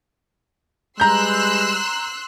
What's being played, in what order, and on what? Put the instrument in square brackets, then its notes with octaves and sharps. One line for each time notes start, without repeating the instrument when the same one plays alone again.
[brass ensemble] G3 G#3 B4 [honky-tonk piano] A#5 G6 [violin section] C6 E6 F#6